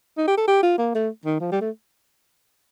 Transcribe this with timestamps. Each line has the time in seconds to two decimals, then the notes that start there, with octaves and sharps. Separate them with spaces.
0.18 D#4
0.28 G4
0.38 A4
0.48 G4
0.63 F4
0.78 A#3
0.95 A3
1.26 D#3
1.41 F3
1.51 G3
1.61 A3